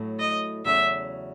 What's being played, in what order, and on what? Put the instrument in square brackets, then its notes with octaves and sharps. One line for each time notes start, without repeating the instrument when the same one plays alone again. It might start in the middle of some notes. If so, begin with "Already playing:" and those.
Already playing: [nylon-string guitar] A2 F#3 A3
[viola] D#5
[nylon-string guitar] E2 C#3 F#3 A3 C#4 [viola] E5